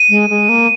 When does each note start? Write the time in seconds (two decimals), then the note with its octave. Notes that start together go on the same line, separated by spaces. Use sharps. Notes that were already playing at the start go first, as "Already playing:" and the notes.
Already playing: D#7
0.09 G#3
0.30 G#3
0.49 A#3